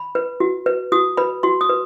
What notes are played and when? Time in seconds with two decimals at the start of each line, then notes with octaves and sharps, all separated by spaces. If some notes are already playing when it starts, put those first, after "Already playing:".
Already playing: B5
0.15 B4
0.40 F#4
0.66 B4
0.92 F#4 D#6
1.17 B4 B5
1.43 F#4 C6
1.61 D#6
1.69 B4